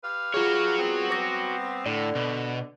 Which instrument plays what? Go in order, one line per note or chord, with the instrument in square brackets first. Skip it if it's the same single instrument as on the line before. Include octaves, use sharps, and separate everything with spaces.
[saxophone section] G4 B4 F5
[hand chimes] F4 G#4 [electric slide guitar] F#4 C#5
[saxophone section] G3 B3 C4
[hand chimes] B4 D6 A#6
[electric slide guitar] A2 [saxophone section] D3 [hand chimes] D5
[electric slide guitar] B2